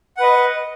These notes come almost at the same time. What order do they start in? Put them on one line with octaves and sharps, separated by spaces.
F#5 B4 D#5